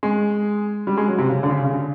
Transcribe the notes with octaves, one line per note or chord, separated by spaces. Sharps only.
G#3
G3
G#3
F#3
C3
C#3
D3
C#3
C#3
D3